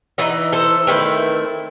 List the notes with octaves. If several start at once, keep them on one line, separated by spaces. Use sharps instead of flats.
E3 B3 D#4 B4 D#5
A4 C5
D#3 A3 C4 E4 G4 B4